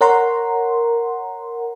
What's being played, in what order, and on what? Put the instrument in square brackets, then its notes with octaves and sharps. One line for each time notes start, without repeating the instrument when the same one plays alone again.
[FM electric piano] A#4 C#5 F#5 A#5 C6